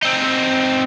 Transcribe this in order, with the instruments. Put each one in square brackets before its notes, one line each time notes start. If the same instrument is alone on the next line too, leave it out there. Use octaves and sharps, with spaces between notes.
[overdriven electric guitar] C4 D#4